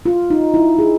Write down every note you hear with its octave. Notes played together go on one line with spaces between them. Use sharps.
F4
D#4
E4
G#4